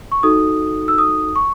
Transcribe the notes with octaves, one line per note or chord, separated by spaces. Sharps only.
C#6
D#4 F#4 A4 D#6
E6
D#6
C#6